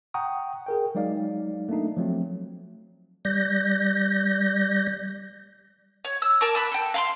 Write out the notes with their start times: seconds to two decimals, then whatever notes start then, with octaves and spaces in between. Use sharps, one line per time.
0.14 F#5 G5 A#5 C#6 D#6
0.66 G#4 A#4 G5
0.95 F#3 G#3 D#4 D5 F5
1.69 A3 A#3 D4 D#4
1.97 F3 F#3 A3 C4
3.25 G3 D5 G6 A#6
6.05 C#5
6.22 E6
6.41 A#4 A5 D6
6.55 A5 B5 F#6
6.72 A4 G5
6.94 F5 B5 C6